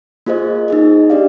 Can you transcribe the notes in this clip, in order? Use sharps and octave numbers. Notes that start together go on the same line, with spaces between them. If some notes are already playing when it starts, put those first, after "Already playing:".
A#3 F4 G#4 C5 D#5
D#4 G#4 D#5
D4 G4 D5 F5